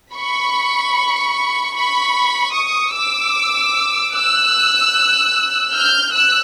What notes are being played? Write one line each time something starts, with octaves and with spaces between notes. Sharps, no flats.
B5 C#6
B5 C#6
C#6 D#6
D6 E6
E6 F#6
F6 G6
E6 F#6